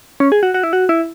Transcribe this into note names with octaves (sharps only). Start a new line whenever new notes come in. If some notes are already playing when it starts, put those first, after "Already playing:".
C#4
G#4
F#4
F#4
E4
F#4
E4